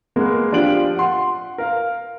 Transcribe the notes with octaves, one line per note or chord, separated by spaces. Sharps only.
G#3 A#3 B3
F3 D4 F4 G4 D7 F#7
F#5 C6
A#4 F5